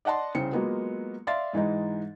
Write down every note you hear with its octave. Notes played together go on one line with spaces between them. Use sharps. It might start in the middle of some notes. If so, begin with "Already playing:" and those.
D5 D#5 F#5 A5 C6
C2 C#3 C5 G5 C#7
F#3 G#3 A#3 B3 F4
D5 E5 F5 C6 A6
G#2 E3 G#3 D#4